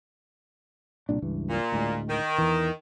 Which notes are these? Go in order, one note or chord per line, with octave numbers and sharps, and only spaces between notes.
C2 A#2 D4
C#2 G2 E3
A#2
D2 A2 G#3
D#3
E2 E3